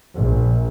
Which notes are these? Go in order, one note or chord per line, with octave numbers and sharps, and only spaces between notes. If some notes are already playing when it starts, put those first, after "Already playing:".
A#1